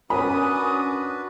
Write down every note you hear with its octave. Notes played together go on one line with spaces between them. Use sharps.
C#4 D4 F#4 A#4 B4 G#5 B5 D#6